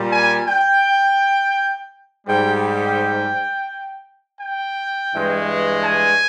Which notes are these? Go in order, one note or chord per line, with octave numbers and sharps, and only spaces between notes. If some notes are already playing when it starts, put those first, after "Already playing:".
Already playing: A#2 G3
G#5
G5
G#2 G3 G5
G5
G5
G2 E3 G#3
G#5